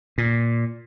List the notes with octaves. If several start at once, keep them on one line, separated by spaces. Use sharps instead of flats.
A#2